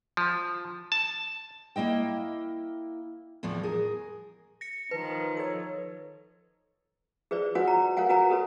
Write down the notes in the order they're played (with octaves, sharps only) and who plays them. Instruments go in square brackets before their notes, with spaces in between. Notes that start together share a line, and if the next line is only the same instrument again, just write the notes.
[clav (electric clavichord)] F3
A5
[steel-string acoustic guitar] A#3 E4 D#5 G5
E2 A2 E3 F3
G#4 A#4
[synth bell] A#6 C#7
[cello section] D#3 F3 [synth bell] B4
[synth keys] A4 C#5
[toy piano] G#4 B4 C5 D5
F#4 B4 C#5 D5 F#5 G#5
A#5
A#4 C#5 F5 F#5 G#5
F#4 B4 F#5 G#5 A#5
G4 A4 B4 C#5